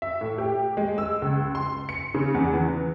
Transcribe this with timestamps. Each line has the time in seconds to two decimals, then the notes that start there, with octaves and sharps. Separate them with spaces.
0.02 E5
0.21 A2
0.38 G4
0.77 G#3
0.98 E6
1.22 C#2
1.55 C6
1.89 C#7
2.15 C#3
2.35 E2
2.54 E3